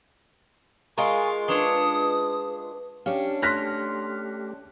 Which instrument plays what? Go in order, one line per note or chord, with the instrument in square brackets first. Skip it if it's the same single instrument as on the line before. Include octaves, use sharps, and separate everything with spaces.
[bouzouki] G#3 F4 A#4 [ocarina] G#5 [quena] C#6
[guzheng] D4 C#5 C6 [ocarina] B4 [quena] D#6
[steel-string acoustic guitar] C#4 D4 [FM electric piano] G4 F5
[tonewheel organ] A3 G4 [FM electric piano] C6 F6 [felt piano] F#6 A#6 B6